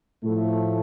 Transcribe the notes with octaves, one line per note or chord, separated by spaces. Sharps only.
A2 F3 A3